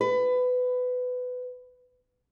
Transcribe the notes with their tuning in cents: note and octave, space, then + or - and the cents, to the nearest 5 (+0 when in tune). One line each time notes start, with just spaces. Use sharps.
B4 +20